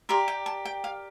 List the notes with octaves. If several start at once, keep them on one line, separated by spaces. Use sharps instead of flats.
G4 A#4 D5 C6
G5
A5
G5
F5